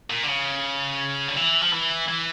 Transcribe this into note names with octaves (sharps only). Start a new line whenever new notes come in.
A#2
D3
C#3
D3
E3
F3
E3
E3